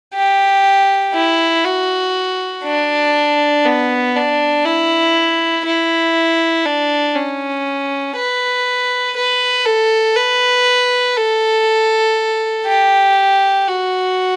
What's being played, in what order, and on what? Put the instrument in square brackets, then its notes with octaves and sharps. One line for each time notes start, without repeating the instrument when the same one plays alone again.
[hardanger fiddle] G4
E4
F#4
D4
B3
D4
E4
E4
D4
C#4
B4
B4
A4
B4
A4
G4
F#4